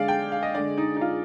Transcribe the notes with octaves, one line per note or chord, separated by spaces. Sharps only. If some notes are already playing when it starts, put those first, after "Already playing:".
Already playing: D3 G#3 D5 F5
G5
F5
D#5
D3 G#3 D5
D#4
D#4
F4